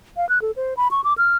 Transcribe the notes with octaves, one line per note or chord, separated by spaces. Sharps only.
F5
F#6
A4
C5
B5
C#6
D6
F6